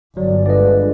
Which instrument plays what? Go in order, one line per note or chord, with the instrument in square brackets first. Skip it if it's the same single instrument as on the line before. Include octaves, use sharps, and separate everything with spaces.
[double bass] G1 [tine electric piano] F#3 [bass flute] D5
[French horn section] D3 G#3 F4 [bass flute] B4 [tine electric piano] D5 D#5